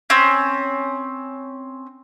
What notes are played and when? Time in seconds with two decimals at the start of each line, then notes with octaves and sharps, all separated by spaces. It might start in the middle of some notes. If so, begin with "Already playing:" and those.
0.10 C4 C#4